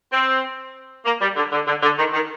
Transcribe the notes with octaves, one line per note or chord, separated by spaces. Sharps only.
C4
A#3
G3
D3
D3
D3
D3
D#3
D#3